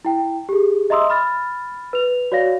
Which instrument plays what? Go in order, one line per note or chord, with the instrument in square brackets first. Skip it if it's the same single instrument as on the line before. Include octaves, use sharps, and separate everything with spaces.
[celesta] E4 G5
G4 G#4
D#5 E5 A#5 C6 D#6 E6
B5 F6 A6
B4 F7
F#4 C#5 D5 F5 A#6